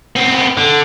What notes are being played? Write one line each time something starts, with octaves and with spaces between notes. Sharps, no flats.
B3 C4
D3